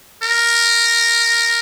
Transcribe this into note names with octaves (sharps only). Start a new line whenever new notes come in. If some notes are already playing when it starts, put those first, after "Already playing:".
A#4